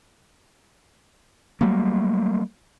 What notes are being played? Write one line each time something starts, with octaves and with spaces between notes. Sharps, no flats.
F#3 G3 A3 A#3